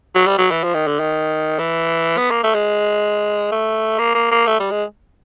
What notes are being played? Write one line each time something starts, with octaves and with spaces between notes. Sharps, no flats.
F#3
G3
F#3
E3
F3
D#3
D3
D#3
E3
B3
A#3
A3
G#3
A3
A#3
A#3
A#3
A3
G3
G#3